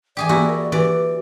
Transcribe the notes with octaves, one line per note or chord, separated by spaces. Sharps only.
E3 G4 G#4 D5 G#5 D6
A#3 E4 F#4 G4
A#4
E3 G4 D5